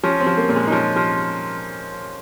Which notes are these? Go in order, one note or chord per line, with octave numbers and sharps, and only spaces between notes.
F3 C#4
C4
F3
A#3
A#2
G#3
D#4
F3 C#4
F3